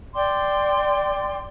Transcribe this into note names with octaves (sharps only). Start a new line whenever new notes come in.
D5 G5 C6 D6